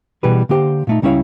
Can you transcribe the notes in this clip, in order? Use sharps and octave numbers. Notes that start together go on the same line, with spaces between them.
B2 E3 G3 G#4 B4
D3 A#3 G4 C5
A#2 A3 D#4
C#2 G3 C#4 E4 C#5 F5